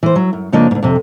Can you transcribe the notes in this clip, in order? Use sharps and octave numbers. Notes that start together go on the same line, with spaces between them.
E3 C5
F#3
F#2
F2 C#3 F3 A#3 D4 D#5
D2 G#2
F2 C3